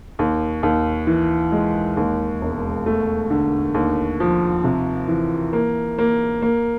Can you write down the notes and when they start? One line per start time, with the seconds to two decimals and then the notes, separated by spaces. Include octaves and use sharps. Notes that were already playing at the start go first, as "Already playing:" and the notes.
0.19 D#2
0.63 D#2
1.07 E3
1.52 G#3
1.97 D#2
2.41 E1
2.86 A3
3.30 D3
3.74 D#2
4.20 F3
4.64 C3
5.08 E3
5.53 A#3
5.98 A#3
6.42 A#3